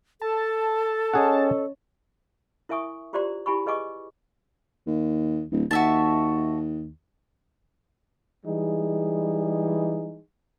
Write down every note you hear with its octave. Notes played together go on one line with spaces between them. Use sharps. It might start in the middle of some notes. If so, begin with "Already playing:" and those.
A4 A5
C#4 G#4 C#5 D#5 F#5
E4 A#4 E5 G#5 C#6 D#6
F4 G4 C5 D5 A#5 C6
E4 G4 G#5 B5 C#6
G#4 B4 D#5 G#5 C#6 D6
D#2
D1
D#2 F#4 E5 A5
E3 G3 G#3 D#4 G#4